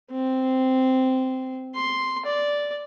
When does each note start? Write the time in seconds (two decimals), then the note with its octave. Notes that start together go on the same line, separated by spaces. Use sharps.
0.11 C4
1.75 C6
2.25 D5